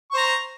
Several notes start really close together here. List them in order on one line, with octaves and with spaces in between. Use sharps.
C#6 C5 A#5